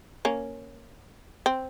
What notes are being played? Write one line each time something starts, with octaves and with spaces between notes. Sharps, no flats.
A#3 C#4
C4